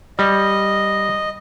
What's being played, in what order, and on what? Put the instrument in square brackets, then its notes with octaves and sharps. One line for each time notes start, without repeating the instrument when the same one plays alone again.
[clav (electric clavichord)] G3 [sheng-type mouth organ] D#5